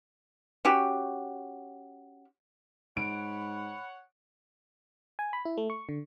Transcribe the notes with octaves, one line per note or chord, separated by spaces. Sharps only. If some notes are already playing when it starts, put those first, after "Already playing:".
C#4 F#4 G4
G#2 C#5 F#5 B5 D7
G#5
B5
E4
A3
C#6
D3